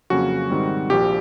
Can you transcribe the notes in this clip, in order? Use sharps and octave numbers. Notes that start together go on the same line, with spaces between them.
F2 C#3 F#3 A#3 C#4 F#4
G#2 D#3 G3 C4
A#1 A#2 F3 G4